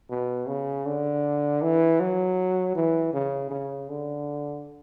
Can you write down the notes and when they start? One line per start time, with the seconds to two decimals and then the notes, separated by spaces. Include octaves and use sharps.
0.10 B2
0.48 C#3
0.86 D3
1.62 E3
2.00 F#3
2.75 E3
3.13 C#3
3.51 C#3
3.89 D3